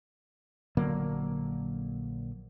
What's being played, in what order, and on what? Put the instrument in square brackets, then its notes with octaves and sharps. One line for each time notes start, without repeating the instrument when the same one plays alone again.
[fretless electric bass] A#1 D3 F#3 A#3